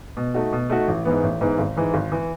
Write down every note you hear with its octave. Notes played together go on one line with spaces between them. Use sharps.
B2
A3 D#4 F#4
B2
A3 D#4 F#4
A1
G#2 E3 B3
A1
G#2 E3 B3
G#1
G#2 E3
G#1
E3